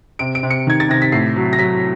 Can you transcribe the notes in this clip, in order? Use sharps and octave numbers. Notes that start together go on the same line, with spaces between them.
C3 D7
D7
C3
C#7
D#3 G#6
A6
C3 A#6
B6
A2 C7
F#3
A#6
F#3 B6